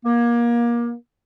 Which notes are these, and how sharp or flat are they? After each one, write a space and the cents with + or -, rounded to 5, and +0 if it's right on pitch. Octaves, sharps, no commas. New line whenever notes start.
A#3 +25